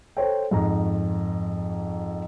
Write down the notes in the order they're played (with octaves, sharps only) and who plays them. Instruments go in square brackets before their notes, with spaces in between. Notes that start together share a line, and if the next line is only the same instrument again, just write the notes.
[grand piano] A4 C5 C#5 G5
F2 G#2 A#5